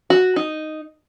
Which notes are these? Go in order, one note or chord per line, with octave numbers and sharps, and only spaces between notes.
F#4
D#4